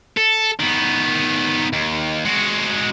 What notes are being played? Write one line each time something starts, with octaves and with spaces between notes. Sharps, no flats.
A4
D#3 B3
D#2
G#3 F#4